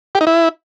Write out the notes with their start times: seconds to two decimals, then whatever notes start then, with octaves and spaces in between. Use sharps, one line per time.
0.15 G4
0.21 D#4
0.27 E4